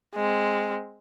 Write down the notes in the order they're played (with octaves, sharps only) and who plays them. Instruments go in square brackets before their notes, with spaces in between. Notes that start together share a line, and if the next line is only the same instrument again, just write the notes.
[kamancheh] G#3 C4